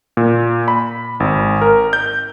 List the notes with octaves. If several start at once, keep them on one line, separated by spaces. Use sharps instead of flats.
A#2
B5
G#1
A#4
G6